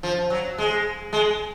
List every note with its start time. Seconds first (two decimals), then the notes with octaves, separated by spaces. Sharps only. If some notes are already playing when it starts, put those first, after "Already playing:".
0.03 F3
0.30 F#3
0.58 G#3
1.13 G#3